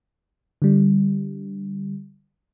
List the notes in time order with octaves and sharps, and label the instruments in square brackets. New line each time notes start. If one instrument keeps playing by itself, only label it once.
[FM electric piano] D3 G3